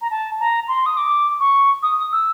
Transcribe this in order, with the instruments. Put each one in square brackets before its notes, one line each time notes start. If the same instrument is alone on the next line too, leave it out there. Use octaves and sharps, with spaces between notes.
[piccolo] A#5
A5
A#5
C6
D#6
D6
C#6
D#6
E6